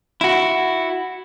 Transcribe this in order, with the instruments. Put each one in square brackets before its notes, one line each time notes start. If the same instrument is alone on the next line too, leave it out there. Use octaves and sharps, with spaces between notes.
[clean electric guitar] E4 F#4